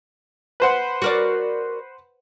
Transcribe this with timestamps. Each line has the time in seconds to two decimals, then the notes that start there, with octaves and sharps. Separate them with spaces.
0.60 B4 C5 F#5
1.02 F#4 A#4 D5